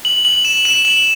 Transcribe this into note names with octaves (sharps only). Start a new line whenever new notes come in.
F#7
F#7
E7
E7
F#7